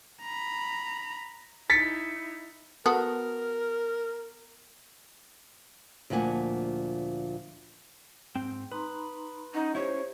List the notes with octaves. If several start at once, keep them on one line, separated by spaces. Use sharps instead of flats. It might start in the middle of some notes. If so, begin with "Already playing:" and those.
A#5 B5
D#4 E4 A6 B6 C#7
B3 F#4 A4 A#4
D2 A#2 F3 F#5 G#5
G#2 C4 G5
D#4 B4 A#5 C6
C#4 D#4 F#5
C#4 E4 G4 C5 C#5